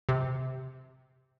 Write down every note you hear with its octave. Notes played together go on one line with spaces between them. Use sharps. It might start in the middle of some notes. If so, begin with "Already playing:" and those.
C3